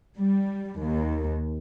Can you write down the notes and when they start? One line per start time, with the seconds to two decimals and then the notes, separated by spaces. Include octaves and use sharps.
0.17 G3
0.81 D#2